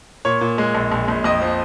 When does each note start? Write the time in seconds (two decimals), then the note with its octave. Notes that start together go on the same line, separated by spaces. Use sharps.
0.25 A#2 C#5
0.41 A#2
0.58 G#3
0.74 A#1
0.92 A#1
1.08 A#1
1.24 F2 D#5
1.41 F3